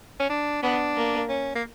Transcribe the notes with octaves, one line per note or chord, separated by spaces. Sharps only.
C#4
D4
B3 D4
A#3
C#4
A#3